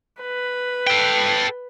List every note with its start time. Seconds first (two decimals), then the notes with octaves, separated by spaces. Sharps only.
0.22 B4
0.87 A4 G5